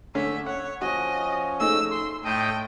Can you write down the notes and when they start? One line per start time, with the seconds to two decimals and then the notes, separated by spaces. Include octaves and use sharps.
0.15 D3 A3 C#4 E5
0.46 C#5 F#5
0.82 F3 C#4 F#4 D#5
1.60 A3 D#4 G#4 E6
1.93 C6
2.25 A2 D#5 G5 A5